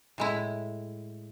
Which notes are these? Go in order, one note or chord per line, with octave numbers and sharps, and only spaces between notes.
A2 G#3 E4